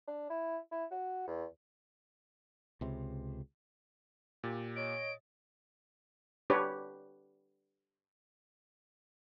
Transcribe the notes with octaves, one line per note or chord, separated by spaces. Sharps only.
D4
E4
E4
F#4
E2
C#2 C3
A#2 G4 A6
C#5 D#5 D7
D4 G4 B4 C#5